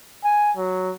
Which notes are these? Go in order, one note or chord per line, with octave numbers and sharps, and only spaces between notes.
G#5
F#3